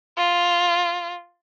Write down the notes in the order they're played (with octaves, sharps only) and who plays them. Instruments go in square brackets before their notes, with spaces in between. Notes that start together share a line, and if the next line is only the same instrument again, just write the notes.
[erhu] F4